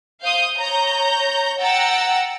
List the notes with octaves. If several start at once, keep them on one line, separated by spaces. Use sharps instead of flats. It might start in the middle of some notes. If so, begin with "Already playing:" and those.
C5 F5 D#6 G6
C#5 A#5 G6
F#5 G5 A#5 E6 A6